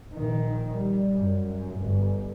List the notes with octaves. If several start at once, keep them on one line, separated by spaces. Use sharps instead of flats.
A#1 D#3
G3
F#2
G1